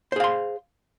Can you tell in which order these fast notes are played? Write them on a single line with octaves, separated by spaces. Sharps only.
C5 G#4 F5 C6